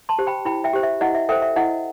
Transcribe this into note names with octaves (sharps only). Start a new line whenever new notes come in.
A5 C6
G4 C5
G5 B5
E4 G5 B5
E5 G5
G4 C5
E5
E4 D#5 F#5
E5
A4 C5 E5 G5
E5
E4 D#5 F#5